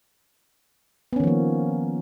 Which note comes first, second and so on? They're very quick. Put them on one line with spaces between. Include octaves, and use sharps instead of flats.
B3 C#4 D#3 F3 A#3